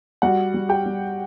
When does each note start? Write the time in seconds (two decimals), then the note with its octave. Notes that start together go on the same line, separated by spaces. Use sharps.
0.22 G3 F#4 F#5
0.54 G3
0.69 G4 G5
0.86 G3